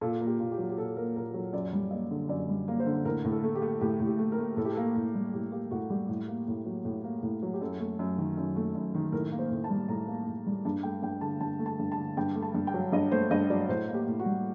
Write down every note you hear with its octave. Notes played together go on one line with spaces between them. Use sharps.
A#2 A4
A#3
G4
A#2
G4
F#3
G4
A#2 A4
A#3 A#4
A#2 A#4
F#3
F#2 D5
G3
A#3 D#5
D3
F#2 D5
G3
A#3
C5
D3
A2 A#4
A2
A4
A3
G4
A3
A2 G4
A2
G4
A3
A#4
A3
A2 A4
G4
A#3 A4
A2
G3
A2 G4
A#3 G4
A2 F#4
G3 G4
A2
A#3
A2
F#3
A2
A#3
A2
F#3
G4
F#2 A4
A3
F#2
D#3
F#2
A3
F#2
D#3
A2 A#4
A#3
C5
A2
A5
G3
A2 A#5
A#3
A2
G3
G2 A5
A3 G5
G2 G5
D3 A5
G2 A5
A3
A5
G2
A5
D3
G2 G5
A3
A5
G2
G5
F#3
G2 D#5
A3 C5
G2 D#5
F#3 D5
A2 C5
A#3
G4
A2
F#4
G3